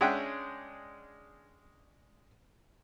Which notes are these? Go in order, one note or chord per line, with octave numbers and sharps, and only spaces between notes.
G#3 C#4 D4 E5 F#5 G5